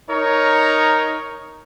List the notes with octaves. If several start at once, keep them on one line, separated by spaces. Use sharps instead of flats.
D#4 A#4 C#5